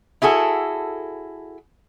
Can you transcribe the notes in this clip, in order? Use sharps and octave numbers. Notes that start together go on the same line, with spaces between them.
E4 F#4 G#4 A4